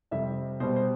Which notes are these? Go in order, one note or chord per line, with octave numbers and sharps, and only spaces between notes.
F2 C3 G3 E5
B2 G3 C5
C5